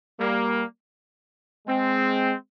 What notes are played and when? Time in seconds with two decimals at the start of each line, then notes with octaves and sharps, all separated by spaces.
0.19 G3 A#3
1.67 G#3 C4